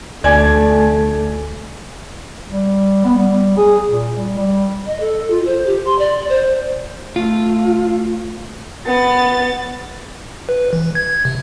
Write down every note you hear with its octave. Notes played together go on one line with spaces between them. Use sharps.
D2 A3 D5 G#5 G#6
G3
B3
G3
G#4
A#2
G3
G3
D#5
A4
F4
C5
G4
C6
D5
C5
A3 F4
B3 A6
B4
E3
G#6
C3